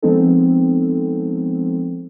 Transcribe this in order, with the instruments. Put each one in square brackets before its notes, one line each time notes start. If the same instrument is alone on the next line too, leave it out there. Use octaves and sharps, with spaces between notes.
[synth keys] F3 G#3 B3 C4 D#4 A4